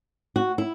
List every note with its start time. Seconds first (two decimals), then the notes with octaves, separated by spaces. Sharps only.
0.36 F#4
0.58 E4